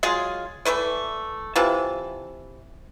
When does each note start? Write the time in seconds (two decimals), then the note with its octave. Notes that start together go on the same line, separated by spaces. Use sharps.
0.03 F#3 G#3 F4 G#4
0.65 E3 A3 B4 D5
1.56 C3 E3 F4 A5